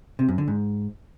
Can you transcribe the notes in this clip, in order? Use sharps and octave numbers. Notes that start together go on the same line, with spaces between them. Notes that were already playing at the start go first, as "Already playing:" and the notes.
C3
F#2
D3
G#2